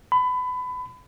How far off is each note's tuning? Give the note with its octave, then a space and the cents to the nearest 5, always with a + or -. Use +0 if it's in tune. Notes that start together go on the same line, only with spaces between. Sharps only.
B5 +25